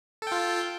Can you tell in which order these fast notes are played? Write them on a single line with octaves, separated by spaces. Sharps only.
A4 G5 F4